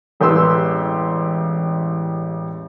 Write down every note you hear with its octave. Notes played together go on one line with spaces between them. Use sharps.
E1 A1 G4 B4 C6 E6